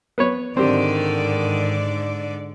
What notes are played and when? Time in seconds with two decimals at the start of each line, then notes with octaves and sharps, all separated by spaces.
0.18 B3 B4 C#5
0.57 G#2 D3 D#3 C4 G4 D5